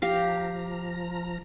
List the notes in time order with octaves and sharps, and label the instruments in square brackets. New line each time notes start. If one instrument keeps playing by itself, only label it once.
[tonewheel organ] F3 A#5 [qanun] G4 F5